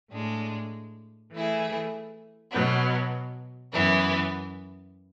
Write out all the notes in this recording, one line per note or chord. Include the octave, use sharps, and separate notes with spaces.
A2 G#3 D4
E3 A3 E4 G#4
B2 F#3 B3
F#2 E3 B3 E4